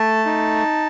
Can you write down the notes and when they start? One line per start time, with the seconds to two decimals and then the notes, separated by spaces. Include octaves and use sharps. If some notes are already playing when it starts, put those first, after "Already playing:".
Already playing: A3 A5
0.26 D#4